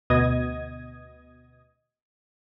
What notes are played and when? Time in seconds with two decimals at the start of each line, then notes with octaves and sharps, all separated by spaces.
0.10 D2 B2 B3 D#5 D#6 G#6